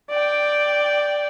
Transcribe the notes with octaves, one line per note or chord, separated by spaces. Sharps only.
D5 G5